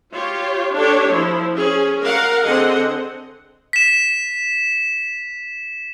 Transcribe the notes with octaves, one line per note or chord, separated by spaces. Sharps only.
F4 G4 C#5
D4 G4 A4 C#5
F3 E4
C#4 G#4
A#4 F5 F#5
D3 C4 G#4 D#5 F#5
B6 E7